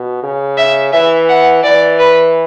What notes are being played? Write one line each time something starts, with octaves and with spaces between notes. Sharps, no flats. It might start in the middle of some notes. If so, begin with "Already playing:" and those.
Already playing: B2
C#3
E5
E3 E5
F#5
E3 D5
B4